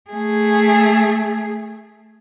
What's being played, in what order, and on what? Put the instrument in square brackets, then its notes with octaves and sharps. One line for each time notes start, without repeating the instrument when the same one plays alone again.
[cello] A3 G#4